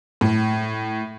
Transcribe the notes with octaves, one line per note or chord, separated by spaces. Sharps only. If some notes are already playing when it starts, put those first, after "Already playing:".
A2